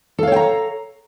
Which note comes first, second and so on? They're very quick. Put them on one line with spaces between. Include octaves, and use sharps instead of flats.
A4 F5 C#5 G5 A#5